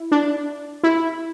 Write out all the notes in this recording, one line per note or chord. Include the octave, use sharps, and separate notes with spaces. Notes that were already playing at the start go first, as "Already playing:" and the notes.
Already playing: E4
D4
E4